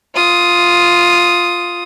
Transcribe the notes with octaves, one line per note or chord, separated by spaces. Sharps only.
F4 D#6